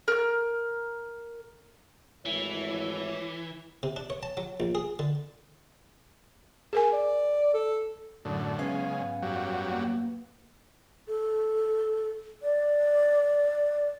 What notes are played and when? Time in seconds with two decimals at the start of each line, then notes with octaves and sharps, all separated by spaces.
0.08 A#4 F6
2.26 G#1 E3 A3 E4 C#5
3.83 C3
3.96 D4
4.10 C#5
4.23 A5
4.37 F#3
4.60 A#1
4.75 G#4
4.99 D3
6.73 G#4 A#4 G#5
6.93 D5
7.54 A4
8.25 F#2 A2 D3 F#3 F#5 D#6
8.59 C#3 G#3 B3 C#4 E5 F5
9.00 G#2
9.22 F#2 F#3 G3
9.70 A#3
11.08 A4
12.43 D5